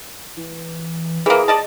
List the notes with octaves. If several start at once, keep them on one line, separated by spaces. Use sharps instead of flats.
E3
E3 A#3 G#4
D5 D#5 A5